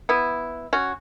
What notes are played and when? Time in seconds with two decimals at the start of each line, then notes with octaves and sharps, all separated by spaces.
0.09 B3 E4
0.73 C#4 F#4